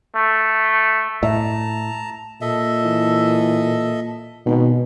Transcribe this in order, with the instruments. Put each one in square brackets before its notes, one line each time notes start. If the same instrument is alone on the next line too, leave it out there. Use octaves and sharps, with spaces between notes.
[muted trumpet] A3
[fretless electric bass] A2 [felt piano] E5 [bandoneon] A5 A#5
[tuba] A#2 [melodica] A4 D#5 E5
[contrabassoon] E3
[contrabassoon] G#1 [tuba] B2